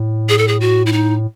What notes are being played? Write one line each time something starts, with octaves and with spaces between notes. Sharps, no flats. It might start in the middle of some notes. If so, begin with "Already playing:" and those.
Already playing: A2
G#4
A4
G#4
F#4
E4
D#4